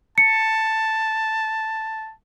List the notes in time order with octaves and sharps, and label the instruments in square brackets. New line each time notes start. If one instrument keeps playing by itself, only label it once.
[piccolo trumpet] A5 [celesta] C#7